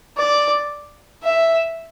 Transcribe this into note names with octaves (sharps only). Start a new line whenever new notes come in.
D5
E5